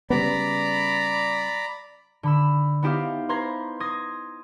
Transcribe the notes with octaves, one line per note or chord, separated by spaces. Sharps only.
C#3 G3 B3 D5 A#5 B5
D3 B5 E6
B3 D#4 E4 G4 C5 F5
B4 C5 A#5 C6 G#6
C6 D#6 G#6 A#6